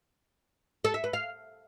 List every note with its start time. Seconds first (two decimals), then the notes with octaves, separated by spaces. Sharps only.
0.84 A4
0.94 E5
1.04 B4
1.13 F5